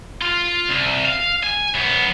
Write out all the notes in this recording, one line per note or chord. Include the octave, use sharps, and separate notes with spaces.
F4
C2
F5
G#5
F#2 B3